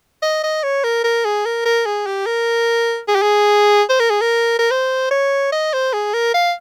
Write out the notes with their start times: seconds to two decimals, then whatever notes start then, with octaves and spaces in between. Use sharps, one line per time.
0.22 D#5
0.43 D#5
0.63 C#5
0.83 A#4
1.04 A#4
1.25 G#4
1.45 A#4
1.65 A#4
1.86 G#4
2.06 G4
2.26 A#4
3.08 G#4
3.15 G4
3.22 G#4
3.89 C5
4.00 A#4
4.10 G#4
4.21 A#4
4.59 A#4
4.71 C5
5.11 C#5
5.52 D#5
5.73 C5
5.93 G#4
6.14 A#4
6.34 F5